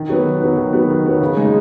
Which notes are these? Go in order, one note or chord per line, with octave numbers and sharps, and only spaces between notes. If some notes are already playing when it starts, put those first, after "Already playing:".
Already playing: D#3
F#3 B3
D#3
F#3 B3
D#3
F#3 B3
D#3
F#3 B3
C#3
G#3 D#4